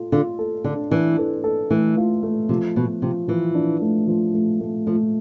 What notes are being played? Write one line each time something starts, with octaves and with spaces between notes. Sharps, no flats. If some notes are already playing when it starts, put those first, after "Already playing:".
Already playing: F4 A4
D3 F4
A4
D3 D4
E3 D4
A4
A4
E3 A3
F4
A3
C3 F3
B2 F3
C3 F3
E3 F3
D4
A3
F3
A3
A3
F3 A3